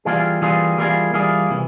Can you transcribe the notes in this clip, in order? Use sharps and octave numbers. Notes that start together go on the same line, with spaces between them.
E3 G3 A#3 F4 G#4
E3 G3 A#3 F4 G#4
E3 G3 A#3 F4 G#4
E3 G3 A#3 F4 G#4
C3 E3